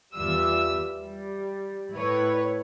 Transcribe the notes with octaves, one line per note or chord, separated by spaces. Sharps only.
E2 G3 F4 E5 E6
G3
A2 E4 B4 C#5